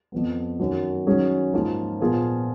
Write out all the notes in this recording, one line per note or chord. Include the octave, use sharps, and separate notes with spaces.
F2 F3 B3
F#2 D#3 F#3
D#3 F#3 C#4 G#4
G#2 F3 A#3 F4
A#2 F3 B3 F4 G#4